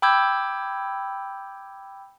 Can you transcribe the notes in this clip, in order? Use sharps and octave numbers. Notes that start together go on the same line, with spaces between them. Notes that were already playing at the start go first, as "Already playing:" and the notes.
G5 B5 D6 E6 G6 G#6